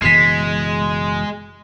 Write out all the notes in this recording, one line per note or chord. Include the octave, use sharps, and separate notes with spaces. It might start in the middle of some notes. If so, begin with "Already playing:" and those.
F#1 B2 E3 G#3 B6 C7